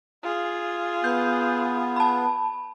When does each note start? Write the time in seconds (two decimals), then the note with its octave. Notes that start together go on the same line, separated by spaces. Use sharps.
0.23 F4 G#4
1.04 B3 G6
1.96 A5 B5